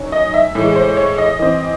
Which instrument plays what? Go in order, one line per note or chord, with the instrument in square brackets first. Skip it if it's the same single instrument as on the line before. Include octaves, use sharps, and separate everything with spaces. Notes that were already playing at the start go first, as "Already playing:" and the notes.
Already playing: [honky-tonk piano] D#3 F#3 C#4
D#5
E5
A2 E3 G#3
C5
C#5
D#5
E3 C4